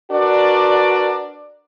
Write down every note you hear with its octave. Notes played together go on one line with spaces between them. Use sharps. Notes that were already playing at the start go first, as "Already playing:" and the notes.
D4 F#4 A#4 B4 D5